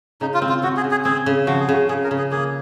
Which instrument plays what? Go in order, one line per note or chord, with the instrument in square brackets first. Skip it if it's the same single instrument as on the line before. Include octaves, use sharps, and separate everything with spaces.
[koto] C#3 [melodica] D#4
[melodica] F4
[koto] C4
[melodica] F4
[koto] C4 [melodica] F#4
[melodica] G#4
[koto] C#3
[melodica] G#4
[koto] C4 [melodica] G#4
[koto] C#3
[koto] F3 [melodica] F#4
[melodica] G#4
[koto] C#3 [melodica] F#4
[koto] C#3 [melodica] G#4
[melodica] A#4
[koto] C#3
[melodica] G#4
[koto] A#3 [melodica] G#4